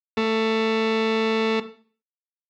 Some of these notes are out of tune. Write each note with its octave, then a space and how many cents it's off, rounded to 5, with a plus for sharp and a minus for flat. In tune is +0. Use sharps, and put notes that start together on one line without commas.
A3 +15